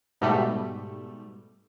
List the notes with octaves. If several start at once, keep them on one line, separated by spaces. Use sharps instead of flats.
G#2 B2 G3 A3